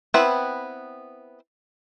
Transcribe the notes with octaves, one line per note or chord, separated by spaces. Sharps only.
B3 C4 E4 B4